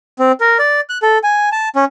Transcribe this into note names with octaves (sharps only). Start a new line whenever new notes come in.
C4
A#4
D5
F#6
A4
G#5
A5
C#4